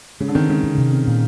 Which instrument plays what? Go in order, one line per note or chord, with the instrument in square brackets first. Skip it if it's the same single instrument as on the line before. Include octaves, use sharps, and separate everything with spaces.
[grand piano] C#3 [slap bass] G#3
[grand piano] D3
[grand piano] D#3 [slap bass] C4
[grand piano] C#3 [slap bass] G#3
[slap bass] D#3
C3
C4
A#2